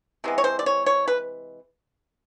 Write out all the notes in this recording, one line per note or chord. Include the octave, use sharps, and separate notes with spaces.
C3 E3 G#3 B3
C#5
C5
D5
C#5
C#5
B4